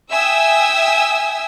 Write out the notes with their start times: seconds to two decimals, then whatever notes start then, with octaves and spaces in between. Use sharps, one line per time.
0.12 E5 G5 G#5 D#6 E6